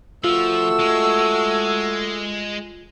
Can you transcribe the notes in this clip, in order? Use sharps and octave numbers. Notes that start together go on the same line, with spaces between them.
F3 A3 F4 F#4 E6
G#3